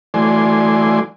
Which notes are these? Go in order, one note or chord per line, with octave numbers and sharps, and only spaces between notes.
E3 F#3 A3 D5 G#5 C6